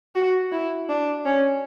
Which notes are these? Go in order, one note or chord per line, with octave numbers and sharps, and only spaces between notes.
F#4
E4
D4
C#4